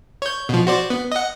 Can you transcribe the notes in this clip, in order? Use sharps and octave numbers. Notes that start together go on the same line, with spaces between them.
C#5 G6
B2 F3
F#4 C5 D5
B3
D#5 F#5